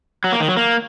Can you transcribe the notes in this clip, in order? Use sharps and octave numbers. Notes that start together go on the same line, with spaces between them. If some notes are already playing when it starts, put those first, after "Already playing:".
F#3
A#3
D#3
F#3
A#3